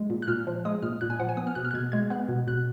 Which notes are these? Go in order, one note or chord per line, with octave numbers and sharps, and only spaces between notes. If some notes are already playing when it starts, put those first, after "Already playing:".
Already playing: G#3
A#2
F#6
A#2 F6
F3
G#3 D#6
A#2 F6
A#2 F#6
G#5
F3 F#5
G#5
B3 D#6
F6
B2 F#6
F6
F#6
B2 G#6
G#3 G#6
B3 F#6
B2
B2 F#6